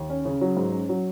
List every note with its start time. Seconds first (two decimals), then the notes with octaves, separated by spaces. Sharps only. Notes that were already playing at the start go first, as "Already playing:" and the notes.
Already playing: D#2
0.10 C#4
0.25 C#3
0.41 F#3
0.57 G#2
0.73 C#4
0.89 F#3